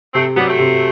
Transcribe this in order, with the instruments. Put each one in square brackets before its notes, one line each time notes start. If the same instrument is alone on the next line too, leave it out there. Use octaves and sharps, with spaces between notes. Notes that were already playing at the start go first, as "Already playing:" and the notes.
[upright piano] C3 [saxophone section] A3 C4
[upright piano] F#3 [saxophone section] G3 B3
[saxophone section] A3 C4
[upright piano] C3